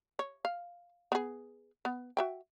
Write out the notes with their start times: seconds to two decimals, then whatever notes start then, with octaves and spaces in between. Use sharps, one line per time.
0.19 C#5
0.45 F5
1.12 B3 G#4
1.85 B3
2.17 F#4 E5 G5